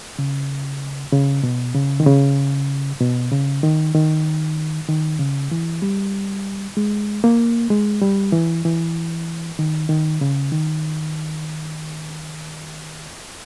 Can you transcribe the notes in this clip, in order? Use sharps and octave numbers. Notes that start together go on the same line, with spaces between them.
C#3
C#3
B2
C#3
D#3
C#3
B2
C#3
D#3
D#3
D#3
C#3
E3
G3
G#3
A#3
G#3
G3
E3
E3
D#3
D#3
C#3
D#3